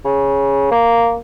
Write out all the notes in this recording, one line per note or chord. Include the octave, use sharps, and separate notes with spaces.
C#3
A#3